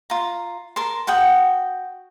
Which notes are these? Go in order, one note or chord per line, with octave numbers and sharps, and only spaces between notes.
F4 A#5
A#4 A5 C6
F#4 F#5 G5 D#6